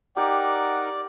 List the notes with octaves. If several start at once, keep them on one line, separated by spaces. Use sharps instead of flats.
D#4 G4 A#4 D5 F#5